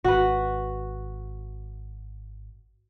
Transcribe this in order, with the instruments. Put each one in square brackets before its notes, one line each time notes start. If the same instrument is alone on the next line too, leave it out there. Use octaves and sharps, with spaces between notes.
[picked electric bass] G#1 [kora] F#4 B4